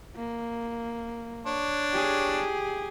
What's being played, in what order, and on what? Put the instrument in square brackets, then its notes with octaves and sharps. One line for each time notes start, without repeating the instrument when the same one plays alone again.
[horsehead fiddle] A#3
[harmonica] D4 C#5
[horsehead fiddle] G4 G#4